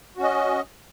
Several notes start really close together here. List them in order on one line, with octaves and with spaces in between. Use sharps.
F#4 C#4 D#5